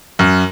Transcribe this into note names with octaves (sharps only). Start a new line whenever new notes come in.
F#2